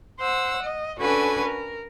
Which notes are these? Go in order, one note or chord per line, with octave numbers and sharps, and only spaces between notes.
C5 F#5 E6
D#5
C#4 D4 F#4 A4 B4 G#5
A#4